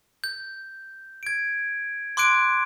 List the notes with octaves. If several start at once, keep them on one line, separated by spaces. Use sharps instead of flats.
G6
G#6 D7
C6 D6 F#6 G#6 D7